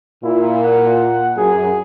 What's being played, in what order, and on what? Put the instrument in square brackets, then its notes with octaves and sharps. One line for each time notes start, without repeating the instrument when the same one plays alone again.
[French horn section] A#2 [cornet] E4
[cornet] F#5
[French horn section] F#2 [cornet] G#4